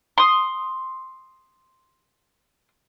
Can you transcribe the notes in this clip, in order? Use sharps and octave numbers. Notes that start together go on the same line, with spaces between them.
C6 D#6